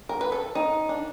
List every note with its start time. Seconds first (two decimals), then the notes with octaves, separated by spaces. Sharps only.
0.09 A#4
0.21 B4
0.32 A4
0.55 D#4
0.89 D4